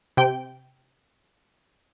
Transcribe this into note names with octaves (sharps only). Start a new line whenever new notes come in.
C3 G5